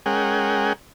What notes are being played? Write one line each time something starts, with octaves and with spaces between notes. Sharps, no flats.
G#3 C#4 G#4 A#4 F#5 G5